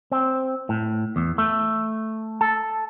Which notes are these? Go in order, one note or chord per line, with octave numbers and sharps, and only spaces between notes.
C4
A2
E2
A3
A4